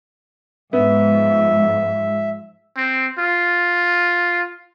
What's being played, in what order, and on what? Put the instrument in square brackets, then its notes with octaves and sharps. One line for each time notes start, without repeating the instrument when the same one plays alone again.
[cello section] G#2 F3 [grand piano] B3 [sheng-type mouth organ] E5
[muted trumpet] C4
F4